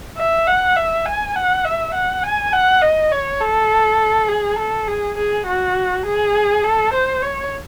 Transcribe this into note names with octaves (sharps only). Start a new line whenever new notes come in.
E5
F#5
E5
G#5
F#5
E5
F#5
G#5
F#5
D#5
C#5
A4
G#4
A4
G#4
G#4
F#4
G#4
A4
C5
C#5